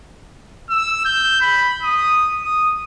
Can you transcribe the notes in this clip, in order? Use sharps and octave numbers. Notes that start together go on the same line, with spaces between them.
E6
G6
B5
D#6
D#6